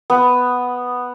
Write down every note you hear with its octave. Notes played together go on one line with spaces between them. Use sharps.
B3